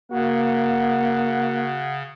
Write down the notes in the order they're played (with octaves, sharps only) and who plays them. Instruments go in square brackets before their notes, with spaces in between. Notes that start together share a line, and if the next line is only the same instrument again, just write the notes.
[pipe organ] C#3 [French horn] A#3 [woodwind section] F#4 F#5